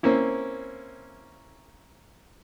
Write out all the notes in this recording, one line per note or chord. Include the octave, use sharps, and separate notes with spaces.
A#3 C4 C#4 E4